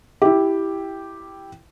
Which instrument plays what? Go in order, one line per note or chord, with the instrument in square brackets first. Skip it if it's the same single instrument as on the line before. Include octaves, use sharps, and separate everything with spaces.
[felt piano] E4 G4